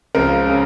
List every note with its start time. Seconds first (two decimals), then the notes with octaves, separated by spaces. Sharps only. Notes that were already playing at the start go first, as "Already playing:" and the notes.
0.15 C#2 C#3 F3 A#4
0.49 C#3